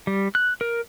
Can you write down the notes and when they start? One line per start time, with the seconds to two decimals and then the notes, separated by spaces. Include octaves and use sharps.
0.07 G3
0.35 F#6
0.61 A#4